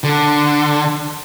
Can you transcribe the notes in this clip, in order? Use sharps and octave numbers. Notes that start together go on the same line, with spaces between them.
D3